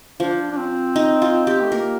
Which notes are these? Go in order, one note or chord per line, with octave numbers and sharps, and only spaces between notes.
F3 D4
D4
C4
D#4
F4
G4
A3
A#3 A#4